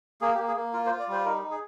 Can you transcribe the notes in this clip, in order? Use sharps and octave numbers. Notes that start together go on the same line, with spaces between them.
A#3 G#4
G4
A#3
G#4
A#3
F4 A#4
C5
F4
D5
G3 C5
D#4 A#4
D#4
G#4